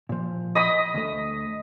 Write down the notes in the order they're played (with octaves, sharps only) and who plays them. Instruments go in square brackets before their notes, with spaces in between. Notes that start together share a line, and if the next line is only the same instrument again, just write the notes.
[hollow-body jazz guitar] A#2 F3
[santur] D#5 B5 D#6
[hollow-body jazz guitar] D2 A3